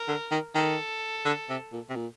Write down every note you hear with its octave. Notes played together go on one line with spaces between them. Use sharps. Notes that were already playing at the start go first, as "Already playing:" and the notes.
Already playing: A#4
D3
D#3
D#3 A4
D3
C3
A#2
C3
A#2